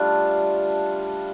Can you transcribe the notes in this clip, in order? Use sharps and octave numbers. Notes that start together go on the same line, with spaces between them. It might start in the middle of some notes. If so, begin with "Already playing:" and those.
Already playing: G3 A3 D4 F4